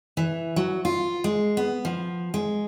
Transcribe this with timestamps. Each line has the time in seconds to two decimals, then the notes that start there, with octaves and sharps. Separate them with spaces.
0.17 E3
0.56 F#3
0.85 F4
1.24 G#3
1.57 B3
1.85 F3
2.34 G#3